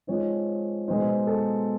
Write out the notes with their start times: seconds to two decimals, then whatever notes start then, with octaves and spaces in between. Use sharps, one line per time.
0.07 F3 G#3 C4 D#4 C#5
0.88 B2 G#3 B3 D#4 C5
1.27 A4